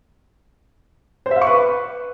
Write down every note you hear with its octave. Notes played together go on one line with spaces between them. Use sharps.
C5
E5
F5
C#6
B4